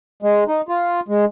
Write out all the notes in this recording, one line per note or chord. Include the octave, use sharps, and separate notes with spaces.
G#3
D#4
F4
G#3